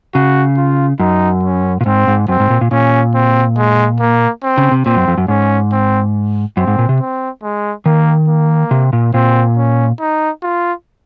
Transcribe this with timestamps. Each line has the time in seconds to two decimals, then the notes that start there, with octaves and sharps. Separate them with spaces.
0.14 C#3 F#4
0.57 F4
0.99 F#2 D#4
1.43 C#4
1.81 A#2
1.86 G#2 C4
2.07 G#2
2.28 F#2 C4
2.40 G#2
2.50 A#2
2.61 A#2
2.71 A#2 C#4
3.14 C4
3.57 G#3
4.00 A#3
4.43 C4
4.58 C#3
4.72 C3
4.86 A#2 C4
4.96 F#2
5.08 F2
5.18 F#2
5.28 G#2 C#4
5.71 C4
6.57 F#2 C4
6.67 G#2
6.79 A#2
6.89 C3
7.00 C4
7.43 G#3
7.86 D#3 A#3
8.28 A#3
8.71 C3
8.93 A#2
9.14 A#2 C4
9.57 C#4
10.00 D#4
10.42 F4